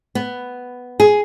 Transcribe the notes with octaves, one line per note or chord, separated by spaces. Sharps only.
B3
G#4